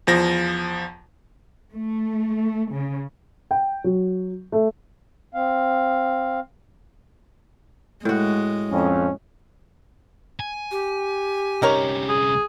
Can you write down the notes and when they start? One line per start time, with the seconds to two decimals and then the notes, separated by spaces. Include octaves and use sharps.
0.07 E2 F3 A#6
1.73 A3
2.72 C#3
3.51 G5
3.84 F#3
4.52 A3
5.34 C4 F5
8.05 A2 G#3 F#4
8.71 F2 C#4
10.40 G#5
10.71 G4
11.62 C2 C#4 D#4 A#4 C#5
12.09 G#4